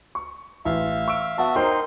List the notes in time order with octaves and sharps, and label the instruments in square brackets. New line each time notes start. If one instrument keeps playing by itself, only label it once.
[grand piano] C#6
[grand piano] A1 [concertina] E5 F5
[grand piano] C#6 E6 D7
[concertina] B3 F#4 E5 [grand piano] F#5 A5
[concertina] D#4 C6 [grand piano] A#4 C5 G5